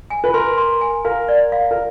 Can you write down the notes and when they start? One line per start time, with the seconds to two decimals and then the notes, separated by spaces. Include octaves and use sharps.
0.10 G#5
0.24 B4
0.34 A#4 C6
0.58 C6
0.81 G#5
1.05 A#4 F5
1.28 D5
1.52 F5
1.71 A#4